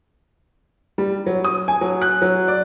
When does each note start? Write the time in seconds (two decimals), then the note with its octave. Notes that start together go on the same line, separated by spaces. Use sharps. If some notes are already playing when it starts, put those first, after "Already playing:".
0.98 G3
1.26 F#3
1.44 D#6
1.68 G#5
1.81 F#3
2.02 F#6
2.22 F#3
2.48 D5